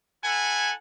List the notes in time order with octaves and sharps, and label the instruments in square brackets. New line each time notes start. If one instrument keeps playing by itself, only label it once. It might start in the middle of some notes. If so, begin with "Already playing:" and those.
[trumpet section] E4 A4 F#5 G#5